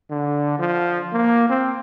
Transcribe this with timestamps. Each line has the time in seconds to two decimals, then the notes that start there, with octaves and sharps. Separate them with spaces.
0.10 D3
0.59 F3
1.13 A#3
1.49 C4